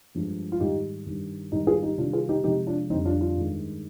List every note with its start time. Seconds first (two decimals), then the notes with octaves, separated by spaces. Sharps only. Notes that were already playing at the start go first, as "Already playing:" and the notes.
0.15 G2 F3 G#3
0.52 F4
0.60 G#2 D#3 G3 D#4 G4
1.06 G2 D#3 G3
1.52 G#2 D#3 G3 D#4 G4
1.67 F4 G#4
1.83 D#4 G4
1.98 C3 D#3 G3 D4 F4
2.13 F4 G#4
2.29 D#4 G4
2.44 C3 F3 G#3 D#4 G4
2.67 D4 F4
2.90 F2 D3 G3 C4 D#4
3.05 D4 F4
3.21 D4 F4
3.36 G2 D#3 G#3